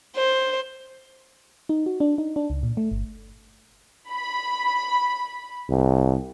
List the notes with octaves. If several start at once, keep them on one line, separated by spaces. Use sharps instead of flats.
C5
D#4
F#4
D4
D#4
D4
C#2
A#2
A3
G1
B5
C2